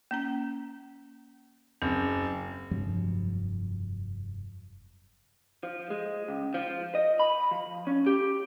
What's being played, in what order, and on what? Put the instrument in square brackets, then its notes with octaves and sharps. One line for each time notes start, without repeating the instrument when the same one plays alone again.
[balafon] A#3 C#4 A#5
[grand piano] F#1 [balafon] C4
[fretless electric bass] F1 G2 F3 F#3
[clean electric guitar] F3
G#3
C#2
F3
D#5
B5
F3
C#4
G4